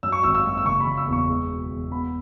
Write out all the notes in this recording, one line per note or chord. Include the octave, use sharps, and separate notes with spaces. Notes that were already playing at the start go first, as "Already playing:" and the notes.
F#2 E6
C#6
G#1 E6
E6
F#2
E6
F#1 C#6
B5
F#1
E6
E2
C#6
G#3
B2
E2
B3 B5